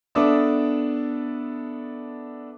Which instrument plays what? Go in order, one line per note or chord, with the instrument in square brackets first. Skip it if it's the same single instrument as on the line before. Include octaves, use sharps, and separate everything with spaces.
[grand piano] B3 D4 A4 E5 D6 D#6